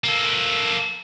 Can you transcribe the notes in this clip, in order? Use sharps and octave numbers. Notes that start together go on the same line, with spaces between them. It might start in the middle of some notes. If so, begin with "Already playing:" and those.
A#3 A4